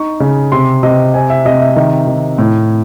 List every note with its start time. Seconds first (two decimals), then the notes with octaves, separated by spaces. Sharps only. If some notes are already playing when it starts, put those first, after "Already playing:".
Already playing: D#4 C#6
0.20 C#3
0.52 C3 C6
0.83 C3 D#5
1.14 C4 G#5
1.30 E5
1.45 C3 D#5
1.61 E5
1.76 D#3
2.08 D#3
2.38 A2